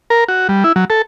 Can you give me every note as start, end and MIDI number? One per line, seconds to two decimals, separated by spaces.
0.10 0.24 70
0.29 0.48 66
0.49 0.64 55
0.64 0.72 64
0.76 0.85 54
0.90 1.02 69